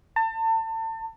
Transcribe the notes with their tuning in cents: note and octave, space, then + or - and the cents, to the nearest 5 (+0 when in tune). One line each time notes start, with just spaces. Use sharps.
A5 +35